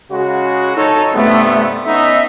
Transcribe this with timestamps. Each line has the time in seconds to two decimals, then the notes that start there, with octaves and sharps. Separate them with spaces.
0.11 C#3 G#3 F#4
0.76 D#4 A4 C#5
1.14 G2 C3 A3 B3
1.86 B3 C#4 D#4 E5